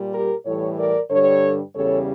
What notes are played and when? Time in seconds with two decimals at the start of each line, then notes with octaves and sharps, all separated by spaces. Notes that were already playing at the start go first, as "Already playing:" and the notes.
Already playing: A#2 G3
0.12 G4 A#4
0.44 A2 E3 G3 A4 C#5
0.77 A#4 D5
1.09 G2 D3 G3 A4 C#5
1.74 E2 C#3 G3 A4 C#5